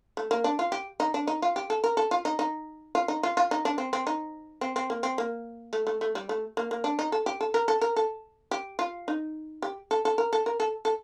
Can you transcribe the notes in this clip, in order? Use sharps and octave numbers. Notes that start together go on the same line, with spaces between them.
A3
A#3
D4
F4
G4
D#4
D4
D#4
F4
G4
A4
A#4
A4
F4
D#4
D#4
F4
D#4
F4
F4
D#4
D4
C4
C4
D#4
C4
C4
A#3
C4
A#3
A3
A3
A3
G3
A3
A#3
A#3
D4
D#4
A4
G4
A4
A#4
A4
A#4
A4
G4
F4
D#4
G4
A4
A4
A#4
A4
A#4
A4
A4